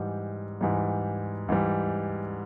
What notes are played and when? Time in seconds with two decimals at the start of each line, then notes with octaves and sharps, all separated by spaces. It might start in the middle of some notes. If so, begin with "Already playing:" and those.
Already playing: G#2 E3 G3
0.61 G#2 E3 G3
1.49 G#2 E3 G3